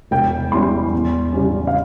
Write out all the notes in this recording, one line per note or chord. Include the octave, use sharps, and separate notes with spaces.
E1 G5
E2 E3 G3 C#4 C6
E2
C#3 G3 C#4
F5